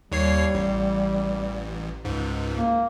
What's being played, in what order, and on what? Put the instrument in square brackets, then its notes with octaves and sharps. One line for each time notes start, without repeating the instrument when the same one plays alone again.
[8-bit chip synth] D#2 C#5 C7 [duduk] G3
[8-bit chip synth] A1
C#2 G#2
[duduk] A#3